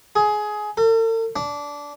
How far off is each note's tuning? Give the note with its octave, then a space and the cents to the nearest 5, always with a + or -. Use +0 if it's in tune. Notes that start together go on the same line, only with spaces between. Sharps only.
G#4 +15
A4 +45
D4 -15